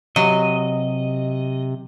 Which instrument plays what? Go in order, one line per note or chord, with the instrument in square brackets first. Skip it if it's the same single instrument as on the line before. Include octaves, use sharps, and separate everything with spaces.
[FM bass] C3 [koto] F#3 [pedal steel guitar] D#5